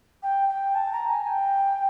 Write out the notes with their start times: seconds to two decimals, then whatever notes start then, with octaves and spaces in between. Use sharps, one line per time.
0.23 G5
0.49 G5
0.75 A5
0.93 A#5
1.10 G#5
1.27 G5